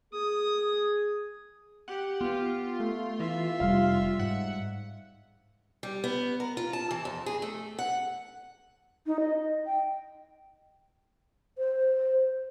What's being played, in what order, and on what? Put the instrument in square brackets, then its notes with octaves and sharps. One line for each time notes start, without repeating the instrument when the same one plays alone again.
[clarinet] G#4 [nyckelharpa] D#6
[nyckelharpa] G4 [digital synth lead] F#5
[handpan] B3 [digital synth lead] F4
[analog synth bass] A3
[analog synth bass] E3 [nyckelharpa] E5
[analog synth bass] F1 [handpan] G3 F5
[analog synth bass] G#2 [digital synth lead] F#5
[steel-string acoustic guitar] G3
B3
A#4
F4
A5
E3
F2
G#4
A3
F#5
[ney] D#4
D#5
G5
[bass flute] C5